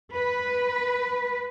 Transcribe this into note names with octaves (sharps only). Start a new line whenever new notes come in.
B4